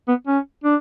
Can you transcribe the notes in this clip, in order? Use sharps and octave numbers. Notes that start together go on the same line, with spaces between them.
B3
C#4
D4